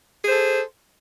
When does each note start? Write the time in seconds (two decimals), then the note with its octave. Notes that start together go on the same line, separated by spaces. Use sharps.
0.24 G#4
0.27 C5
0.30 A4